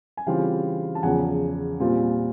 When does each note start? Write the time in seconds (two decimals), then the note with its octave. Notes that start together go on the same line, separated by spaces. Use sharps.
0.17 G#5
0.26 C#3 E3 G3 C4 F4 F5 G5
0.95 A5
1.03 E2 C#3 F3 F#5 G#5
1.80 A#2 G3 C4 F4